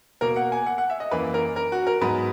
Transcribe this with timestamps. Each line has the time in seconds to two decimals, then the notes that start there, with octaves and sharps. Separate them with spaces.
0.21 B2 A#3 A#4
0.36 F#5
0.52 G#5
0.66 F#5
0.78 F#5
0.90 E5
1.00 D#5
1.11 F#2 E3 A#3 B4
1.34 A#4
1.56 A#4
1.72 F#4
1.87 A#4
2.01 G#2 F#3 B3 B4